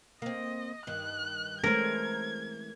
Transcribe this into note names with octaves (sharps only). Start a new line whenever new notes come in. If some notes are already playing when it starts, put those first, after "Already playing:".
A#3 C4 D#5
G2 D#3 F#6
E3 G#3 A3 C4 C#4 A#4 G#6